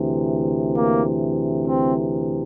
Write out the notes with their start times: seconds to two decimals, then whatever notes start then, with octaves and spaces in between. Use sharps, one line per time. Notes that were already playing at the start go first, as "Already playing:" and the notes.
Already playing: D2 C3 E3
0.75 A#3
1.66 C4